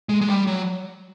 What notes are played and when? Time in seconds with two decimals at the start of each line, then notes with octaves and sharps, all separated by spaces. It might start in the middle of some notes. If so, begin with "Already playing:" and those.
0.09 G#3
0.21 G#3
0.29 G3
0.47 F#3